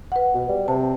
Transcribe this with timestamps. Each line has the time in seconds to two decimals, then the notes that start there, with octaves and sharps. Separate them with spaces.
0.12 B4 F#5
0.34 B2
0.49 G3
0.68 C3 A5